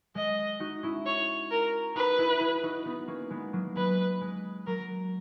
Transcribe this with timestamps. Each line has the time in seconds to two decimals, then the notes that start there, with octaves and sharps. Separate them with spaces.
0.15 G#3 D#5
0.60 D#4 F#4
0.83 C#4 E4
1.06 C#5
1.51 A#4
1.95 D#4 F#4 B4
2.18 E4 G#4
2.40 E4 G#4
2.63 D#4 F#4
2.85 B3 D#4
3.08 A#3 C#4
3.30 G#3 B3
3.53 F#3 A#3
3.76 G#3 B4
4.21 G#3
4.66 F#3 A#4